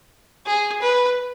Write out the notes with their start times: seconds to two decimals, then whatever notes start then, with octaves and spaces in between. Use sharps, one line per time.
0.46 G#4
0.82 B4